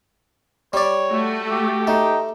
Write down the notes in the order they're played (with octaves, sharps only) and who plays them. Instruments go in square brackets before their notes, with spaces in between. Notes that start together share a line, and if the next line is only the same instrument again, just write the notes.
[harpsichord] G3 D5 [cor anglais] C#5
[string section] A3 F#4
[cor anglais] G4
[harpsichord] A3 [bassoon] D#4